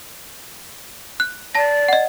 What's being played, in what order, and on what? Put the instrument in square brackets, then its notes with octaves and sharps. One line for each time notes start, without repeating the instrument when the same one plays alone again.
[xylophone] F#6
[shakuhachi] D5 [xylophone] A5 A#6
[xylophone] D#5 F#5